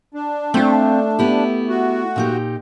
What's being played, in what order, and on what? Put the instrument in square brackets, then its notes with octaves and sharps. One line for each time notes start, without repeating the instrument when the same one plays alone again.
[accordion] D4
[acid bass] A3 [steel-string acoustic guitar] C4 F4 F5
[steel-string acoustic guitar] B3 E4 G4
[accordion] F#4
[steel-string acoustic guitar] A#2 D#4 G4